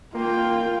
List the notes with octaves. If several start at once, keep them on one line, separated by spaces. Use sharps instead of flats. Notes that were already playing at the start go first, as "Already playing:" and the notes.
A#3 F4 G5